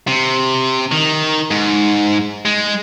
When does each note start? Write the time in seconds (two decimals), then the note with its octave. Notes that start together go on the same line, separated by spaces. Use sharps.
0.08 C3
0.92 D#3
1.51 G#2
2.45 G#3